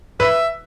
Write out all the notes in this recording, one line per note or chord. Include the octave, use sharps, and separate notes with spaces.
B4 E5